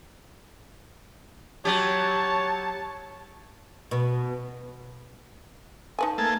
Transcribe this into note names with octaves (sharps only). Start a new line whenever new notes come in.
F#3 G4 C#5 A5
B2
D#4 B4 G#5 A5
A3 A#3 A5 G#6